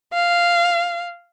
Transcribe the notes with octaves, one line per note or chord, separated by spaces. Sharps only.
F5